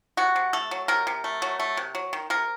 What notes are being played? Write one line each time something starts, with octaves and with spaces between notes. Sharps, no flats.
C3 F#4
C3
A3 A4
F#3
C3 A#4
C3
A3
F#3
A3
C3
F#3
D#3
C3 A#4